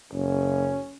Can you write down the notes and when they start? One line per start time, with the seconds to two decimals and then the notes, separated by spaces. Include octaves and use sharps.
0.13 F#1 C#4